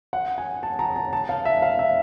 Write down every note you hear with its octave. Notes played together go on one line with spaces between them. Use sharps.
F#5
G#5
A5
A#5
A5
A5
F5
E5
F5
E5